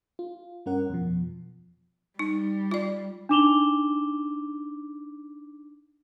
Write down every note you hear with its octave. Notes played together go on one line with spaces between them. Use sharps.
F4
G2 C#4 A#4 F#5
F2 B2 F3
G3 D#4
F4 D5
D4 D#4 D6 E7 F7 G7